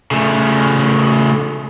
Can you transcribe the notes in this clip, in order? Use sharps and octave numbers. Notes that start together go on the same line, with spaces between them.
C#3 A3